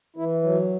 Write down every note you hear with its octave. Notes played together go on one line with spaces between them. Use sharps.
E3 E4
F#3